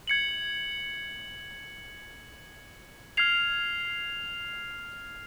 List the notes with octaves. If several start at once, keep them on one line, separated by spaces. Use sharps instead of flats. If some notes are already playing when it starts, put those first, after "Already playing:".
G#6 C#7 F#7
F6 G#6 C7 F7